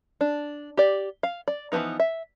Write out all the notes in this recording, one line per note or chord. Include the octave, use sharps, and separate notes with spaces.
D4
G4 D5
F5
D5
E3 F3 A3 B3 D#4
E5